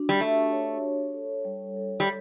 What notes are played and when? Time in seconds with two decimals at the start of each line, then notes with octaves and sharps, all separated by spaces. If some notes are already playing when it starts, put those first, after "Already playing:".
Already playing: D4 F#4
0.09 G3
0.20 A3 G4
0.52 C#5
0.83 C#5
1.14 A4
1.45 G3
1.76 A4
2.00 G3